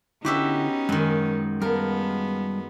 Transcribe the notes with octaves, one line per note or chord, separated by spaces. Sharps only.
D3 B3 C#4 D#4 E4 F#4 G4 E5
F#2 D#3 G#3
G3 G#3 B3 A#4 F5 A5